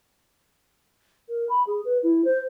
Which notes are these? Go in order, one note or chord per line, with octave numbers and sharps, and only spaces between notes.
A#4
B5
G#4
B4
E4
C5